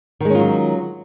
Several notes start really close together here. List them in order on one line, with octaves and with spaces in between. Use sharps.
D#3 G#3 C#4 F4 F#3